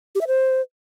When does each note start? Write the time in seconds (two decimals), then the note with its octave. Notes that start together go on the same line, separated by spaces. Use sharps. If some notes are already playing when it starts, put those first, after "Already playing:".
0.15 G4
0.21 E5
0.27 C5